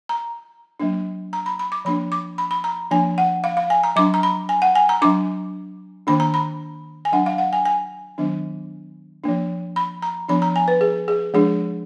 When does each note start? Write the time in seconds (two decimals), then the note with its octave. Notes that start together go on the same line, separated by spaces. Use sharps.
0.09 A#5
0.80 F#3 A#3 D4
1.33 A#5
1.46 B5
1.59 B5
1.72 D6
1.85 F3 A#3 D4 B5
2.12 D6
2.38 B5
2.51 B5
2.64 A#5
2.91 F3 A#3 D4 G#5
3.18 F#5
3.44 F5
3.57 F5
3.70 G#5
3.83 A#5
3.96 F#3 D4 D6
4.14 A#5
4.23 B5
4.49 G#5
4.62 F#5
4.75 G#5
4.89 A#5
5.02 F#3 D4 D6
6.07 D#3 A#3 D4 B5
6.20 A#5
6.34 B5
7.05 G#5
7.12 F#3 D4 F#5
7.26 F5
7.38 F#5
7.53 G#5
7.65 G#5
8.18 D#3 F#3 B3 D4
9.24 F3 A#3 D4
9.76 B5
10.02 A#5
10.29 F3 B3 D4 B5
10.42 A#5
10.56 G#5
10.68 B4
10.81 G#4
11.08 G#4
11.34 F3 G#3 D4 G#4